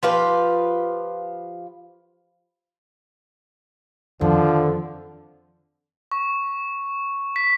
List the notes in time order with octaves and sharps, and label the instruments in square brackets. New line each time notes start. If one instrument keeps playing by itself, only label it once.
[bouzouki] F3 F4 G4 B4
[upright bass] F2 [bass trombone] D3 [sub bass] D#3 [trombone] F3
[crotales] C#6
B6